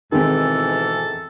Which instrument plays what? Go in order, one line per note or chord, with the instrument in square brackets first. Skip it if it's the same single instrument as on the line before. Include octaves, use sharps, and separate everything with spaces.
[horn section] G#2 B2 E3 [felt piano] D#3 G#3 C4 [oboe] A4